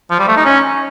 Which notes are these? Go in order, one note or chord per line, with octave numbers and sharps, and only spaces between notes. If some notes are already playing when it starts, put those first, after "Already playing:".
F3
G3
A3
D#4
C#4